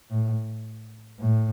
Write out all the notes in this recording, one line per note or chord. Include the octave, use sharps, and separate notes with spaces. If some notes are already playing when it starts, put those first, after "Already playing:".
A2
A2